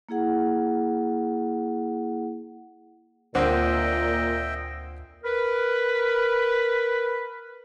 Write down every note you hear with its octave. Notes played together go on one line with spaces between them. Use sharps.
A#3 E4 G#4 F#5
D2 A#2 D3 C4 D#5 E5 G5
A#4 B4